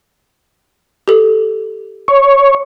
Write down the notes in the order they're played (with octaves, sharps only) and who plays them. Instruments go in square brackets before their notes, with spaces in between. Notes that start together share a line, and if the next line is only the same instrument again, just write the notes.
[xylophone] G4 A4
[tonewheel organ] C#5